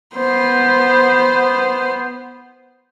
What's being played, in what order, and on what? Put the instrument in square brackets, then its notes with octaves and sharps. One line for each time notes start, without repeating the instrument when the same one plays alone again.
[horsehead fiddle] B3 C5